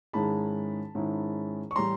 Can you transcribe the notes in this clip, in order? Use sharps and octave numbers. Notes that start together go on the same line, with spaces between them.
G#2 D#3 G#3 C#4 E4 A5 B5
G#2 D#3 G#3 C#4 E4
C#6
A2 E3 G3 A#5 C6